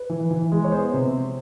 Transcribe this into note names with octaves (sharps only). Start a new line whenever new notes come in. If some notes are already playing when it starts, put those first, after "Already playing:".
Already playing: B4
E3
E3
G#3
C#5
B3 C5
C3